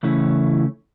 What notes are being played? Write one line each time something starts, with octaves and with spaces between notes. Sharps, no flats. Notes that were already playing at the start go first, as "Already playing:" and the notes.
C#3 E3 A3 C#4 E4